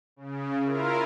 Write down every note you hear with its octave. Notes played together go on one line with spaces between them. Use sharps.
C#3
E4 F4 A#4